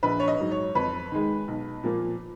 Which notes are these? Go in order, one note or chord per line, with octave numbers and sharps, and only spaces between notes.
A#1 B4
C#5
D#5
G#2 F#3
C#5
F2 B4
D#3 G#3
B1
A#2 F3 A#3